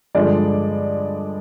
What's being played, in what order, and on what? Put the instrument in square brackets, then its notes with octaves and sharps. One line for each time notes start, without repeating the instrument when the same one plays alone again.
[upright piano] G2 D3 F3 G#3 D5